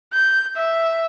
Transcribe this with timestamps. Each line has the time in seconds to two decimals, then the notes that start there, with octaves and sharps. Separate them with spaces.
0.13 G6
0.56 E5